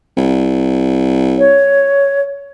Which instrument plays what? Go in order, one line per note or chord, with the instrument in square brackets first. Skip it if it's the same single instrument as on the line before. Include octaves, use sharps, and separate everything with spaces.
[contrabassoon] C2
[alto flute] C#5